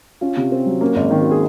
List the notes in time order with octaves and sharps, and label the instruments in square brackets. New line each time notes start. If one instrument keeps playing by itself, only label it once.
[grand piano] C#4 [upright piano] F4
[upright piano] C3
C4
F#3
[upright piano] A#3 [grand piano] C#4
[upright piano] G#1
[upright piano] D#3 [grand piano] C4
[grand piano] F#4
G#4